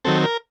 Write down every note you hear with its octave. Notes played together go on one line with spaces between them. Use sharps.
D#3 F#3 C4 A4
A#4